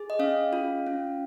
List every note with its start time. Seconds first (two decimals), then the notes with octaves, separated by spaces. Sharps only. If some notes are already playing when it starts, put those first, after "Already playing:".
Already playing: G#4
0.10 D#5
0.19 C#4 F5
0.53 F4
0.87 C#4